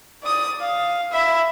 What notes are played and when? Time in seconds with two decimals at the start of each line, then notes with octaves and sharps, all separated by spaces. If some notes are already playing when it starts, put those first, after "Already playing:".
0.23 D5 D#6
0.61 F5
1.12 E5 B5